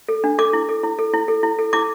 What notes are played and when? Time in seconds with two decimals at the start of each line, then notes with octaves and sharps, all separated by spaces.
0.08 A4
0.24 D4
0.38 A4 D6
0.53 E4
0.69 A4
0.83 E4
0.99 A4
1.13 E4
1.28 A4
1.43 E4
1.59 A4
1.73 E4 D6